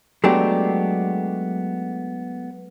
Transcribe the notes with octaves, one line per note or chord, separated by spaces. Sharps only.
F#3 G#3 A3 B3 D4 G4